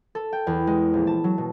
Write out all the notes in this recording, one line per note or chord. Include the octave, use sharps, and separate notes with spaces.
A4
G5
E2
G#3
A#1
A5
F#3
B2